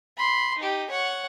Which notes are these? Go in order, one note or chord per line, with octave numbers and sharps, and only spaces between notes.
B5 C6
D#4 G4
C#5 F#5